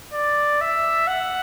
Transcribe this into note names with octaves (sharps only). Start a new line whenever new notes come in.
D5
E5
F#5